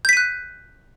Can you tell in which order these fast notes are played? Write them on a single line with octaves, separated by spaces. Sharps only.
G6 B6 D#7 F#6